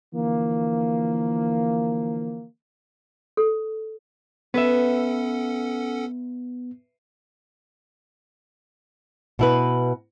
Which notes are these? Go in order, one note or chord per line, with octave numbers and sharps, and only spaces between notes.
D3 E3 F3 A#3
A4
B3 C#4 A4 B4 E5 F#5
B2 E4 B4